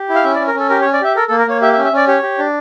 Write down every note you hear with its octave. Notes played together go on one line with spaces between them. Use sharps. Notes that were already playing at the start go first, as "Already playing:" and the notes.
Already playing: G4
E4
F5
C#4 E5
D5
C#4
A#4
C#4 A4
G4 A#4
C#5
C#4
D5
G4 E5
A4 A#4
A#3 A4
A#4
A#3 C#5
G4 E5
E5
C#4
E5
C#4 D5
G4 C#5
G4
D4